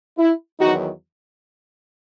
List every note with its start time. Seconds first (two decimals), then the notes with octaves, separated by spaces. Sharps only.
0.18 E4
0.60 E2 D#3 F#3 D#4 F#4